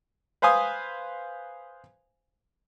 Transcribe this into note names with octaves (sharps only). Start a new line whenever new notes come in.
B4 C5 F5 G#5 D#6